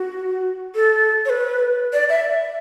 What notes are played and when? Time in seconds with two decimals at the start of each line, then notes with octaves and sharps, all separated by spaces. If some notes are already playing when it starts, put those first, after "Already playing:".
Already playing: F#4
0.75 A4
1.25 C#5
1.30 B4
1.93 D5
2.09 E5